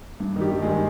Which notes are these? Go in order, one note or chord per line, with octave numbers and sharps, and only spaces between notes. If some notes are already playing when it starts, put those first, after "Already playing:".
G2
D#3
G3 G4
G2
G#3 G#4
D#3